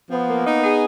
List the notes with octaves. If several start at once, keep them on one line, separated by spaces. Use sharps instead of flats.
F3 B3
A#3
D#4
G#4